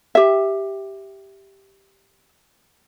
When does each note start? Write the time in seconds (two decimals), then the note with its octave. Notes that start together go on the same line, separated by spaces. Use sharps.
0.15 G4 E5